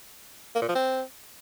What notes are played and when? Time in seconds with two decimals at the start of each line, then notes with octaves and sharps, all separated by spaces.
0.55 A#3
0.62 A#2
0.69 F3
0.75 C4